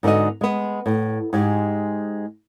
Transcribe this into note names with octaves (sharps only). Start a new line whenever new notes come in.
G#2 D3 B3 F#4 D#5
G#3 B3
A2
G#2 G#3 G4